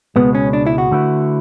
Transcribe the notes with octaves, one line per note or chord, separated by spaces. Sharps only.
C#2 B2 G#3 B3
C#4
D4
E4
F#4
D3 A3 E4 B4